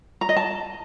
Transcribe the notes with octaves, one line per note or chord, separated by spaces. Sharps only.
A#5
D#5
A5